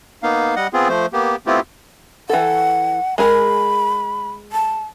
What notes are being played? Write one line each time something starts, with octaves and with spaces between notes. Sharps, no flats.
A#3 B3 D#4 F5
G3 D#5 F#5
B3 C4 F4 G#4
F3 A3 C5
A#3 B3 G4
A3 B3 C4 E4 F4 G4
E3 A4 F#5
G#3 G#4 A#4 B5
A5